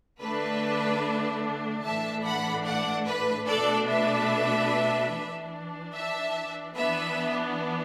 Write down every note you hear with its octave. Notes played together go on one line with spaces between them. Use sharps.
D3 A3 D4 B4
A2 E3 A3 D4 E5 A5
F#5 B5
D5 F#5
B4
B2 A3 D4 A4 D5
B4 E5
E3 D4
E5 A5
E3 B3 D4 B4 E5